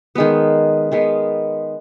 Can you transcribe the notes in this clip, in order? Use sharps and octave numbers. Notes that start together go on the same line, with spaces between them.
D#3 G#3 B3
D#3 G#3 B3